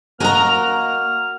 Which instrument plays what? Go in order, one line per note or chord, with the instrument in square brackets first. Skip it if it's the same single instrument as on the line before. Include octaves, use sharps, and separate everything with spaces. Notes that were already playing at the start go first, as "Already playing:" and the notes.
[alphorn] A#3 [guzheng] F#4 A#4 D#5 [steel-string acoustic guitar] G#5 A#5 [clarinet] F6